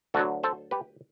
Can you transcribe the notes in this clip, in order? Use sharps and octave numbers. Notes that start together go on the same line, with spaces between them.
D2 D3 F#3 F#4 A4
A4 C5
G4 B4